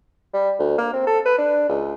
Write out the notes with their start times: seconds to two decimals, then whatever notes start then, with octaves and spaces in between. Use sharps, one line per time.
0.33 G3
0.59 D2
0.78 A#3
0.93 C4
1.07 A4
1.25 B4
1.38 D4
1.69 C#2